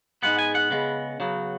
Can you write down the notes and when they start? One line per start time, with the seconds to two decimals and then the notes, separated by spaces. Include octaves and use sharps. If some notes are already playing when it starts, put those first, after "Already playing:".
0.23 G#2 G#3 B3 F#5
0.39 G#5
0.55 F#5
0.71 C#3 G#3 B3
1.20 C#3 F#3 B3